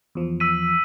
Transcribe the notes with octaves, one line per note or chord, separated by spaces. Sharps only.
E2 F3
E6 B6 D#7